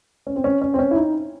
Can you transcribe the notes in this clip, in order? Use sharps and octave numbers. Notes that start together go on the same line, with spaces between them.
C#4
C4
C#4
C#4
C4
C#4
E4
D#4